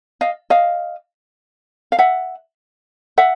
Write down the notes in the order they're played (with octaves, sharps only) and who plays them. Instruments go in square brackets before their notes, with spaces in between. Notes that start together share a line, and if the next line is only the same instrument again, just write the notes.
[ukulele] D#5 F5
D#5 F5
F5
E5 F#5
E5 F#5